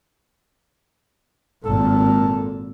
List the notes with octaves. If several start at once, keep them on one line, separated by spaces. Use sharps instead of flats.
G#1 A#2 A4